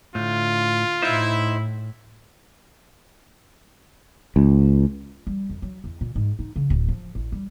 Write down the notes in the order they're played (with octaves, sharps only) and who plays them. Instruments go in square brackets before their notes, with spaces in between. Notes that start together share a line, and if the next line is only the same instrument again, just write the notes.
[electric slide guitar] A2 [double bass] D3 [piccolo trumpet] F4
[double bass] A2 [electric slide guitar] D#4 C5 [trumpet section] E4
[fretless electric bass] C#2
[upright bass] G3
F2
F#3
E2
A#2
G#2
D#4
C#3
D1
F3
A1
G3